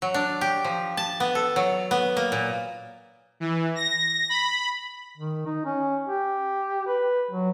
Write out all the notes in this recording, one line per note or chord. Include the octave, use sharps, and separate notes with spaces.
F#3
D4
G4
F3
A5
B3
A4
F#3
B3
A#3
A#2
E3
A#6
B5
D#3
D#4
C#4
G4
B4
F#3